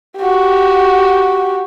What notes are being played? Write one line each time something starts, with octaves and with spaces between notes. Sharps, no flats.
F#4 G4